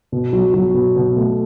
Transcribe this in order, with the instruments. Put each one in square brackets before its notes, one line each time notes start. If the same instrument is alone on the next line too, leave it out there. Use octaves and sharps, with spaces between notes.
[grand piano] B2
F#3
F#3
B2
B2
A3